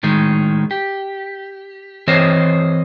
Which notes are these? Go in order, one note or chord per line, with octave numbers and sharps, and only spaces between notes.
A2 D#3 G#3
G4
E3 C4 G#4 C5 C#5 D#5